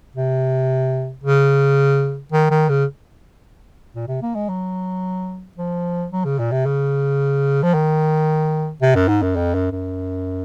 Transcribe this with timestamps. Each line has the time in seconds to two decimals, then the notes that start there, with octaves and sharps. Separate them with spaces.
0.16 C3
1.24 C#3
2.32 D#3
2.50 D#3
2.69 C#3
3.95 A#2
4.08 C3
4.22 A#3
4.35 G#3
4.49 F#3
5.57 F3
6.11 F#3
6.25 C#3
6.39 A#2
6.52 C3
6.66 C#3
7.63 F3
7.74 D#3
8.82 C3
8.95 F#2
9.08 G#2
9.22 F#2
9.36 F2
9.54 F#2
9.72 F#2